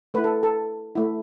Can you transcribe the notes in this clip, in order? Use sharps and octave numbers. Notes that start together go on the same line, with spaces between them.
A3 E4 B4
A4
A4
A3 E4